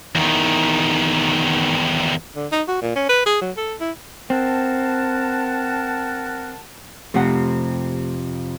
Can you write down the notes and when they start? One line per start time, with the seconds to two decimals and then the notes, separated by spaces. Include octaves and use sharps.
0.15 E2 D#3
2.36 D3
2.52 D#4
2.68 F#4
2.82 A#2
2.96 C#4
3.09 B4
3.26 G#4
3.41 F#3
3.57 A4
3.80 E4
4.30 C4 A#4 F#5 A5
7.14 F2 C3 A3 G4 F#5